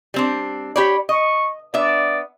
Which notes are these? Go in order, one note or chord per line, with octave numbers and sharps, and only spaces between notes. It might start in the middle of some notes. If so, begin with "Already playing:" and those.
G3 C4 D4
G4 C#5 D5 B5
D#5 C#6
B3 D4 D5 E5